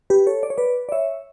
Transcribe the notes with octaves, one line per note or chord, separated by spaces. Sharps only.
G4 B4
A4 C#5
D5
C#5
B4 D5
D5
C#5 E5